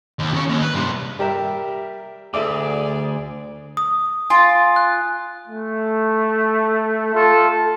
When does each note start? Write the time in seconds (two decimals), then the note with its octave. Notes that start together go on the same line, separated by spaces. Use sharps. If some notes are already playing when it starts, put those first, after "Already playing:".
0.19 D#2
0.34 C#3 C#5
0.48 D#2
0.62 B4
0.75 G2 C3
1.19 G3 G4 A#4 E5
2.34 D2 G#4 A4 D5 E5 D6
3.77 D#6
4.30 F4 G#5
4.76 F#6
5.48 A3
7.15 F4 A4